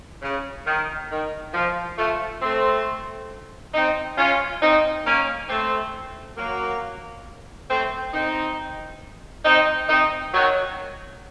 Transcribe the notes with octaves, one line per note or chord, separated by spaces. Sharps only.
C#3
D#3
D#3
F3
F3 A3
A3 C4
C4 D#4
C#4 F4
C4 D#4
A#3 C#4
A3 C4
F#3 A#3
A3 C4
C4 D#4
C4 D#4
C4 D#4
D#3 F#3